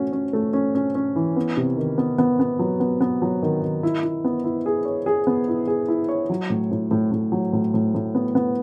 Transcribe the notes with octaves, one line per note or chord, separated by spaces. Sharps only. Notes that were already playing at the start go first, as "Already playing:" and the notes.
Already playing: A3 C#4 F#4
C#4
A3
C#4
C#4
C#4
E3
B3
C3
D#3
B3
B3
B3
F#3
B3
B3
F#3
D#3
D#3
E4
E4
B3
E4
G#4
C#5
G#4
B3
E4
G#4
E4
C#5
F#3
A2
A2
A2
A2
F#3
A2
A2
A2
B3
B3